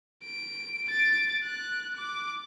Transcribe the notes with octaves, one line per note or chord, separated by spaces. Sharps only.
D7
A6 D7
F#6
D6